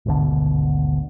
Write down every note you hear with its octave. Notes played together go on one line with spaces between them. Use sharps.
G#1 D2 B2 D3